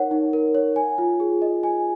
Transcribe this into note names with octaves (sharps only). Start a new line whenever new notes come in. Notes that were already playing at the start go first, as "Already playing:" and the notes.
Already playing: D#4 A#4 C#5 F#5
D#4
A#4
C#5
G#5
F4
G#4
D#5
G#5